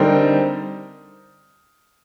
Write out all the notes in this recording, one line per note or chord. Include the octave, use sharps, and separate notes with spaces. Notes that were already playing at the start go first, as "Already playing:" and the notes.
Already playing: D3 G3 C4 D#4 A#4